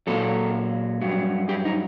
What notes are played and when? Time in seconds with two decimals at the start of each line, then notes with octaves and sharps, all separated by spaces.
0.07 A#2 F#3 A4
1.01 G2 F#3
1.49 G4
1.65 D#4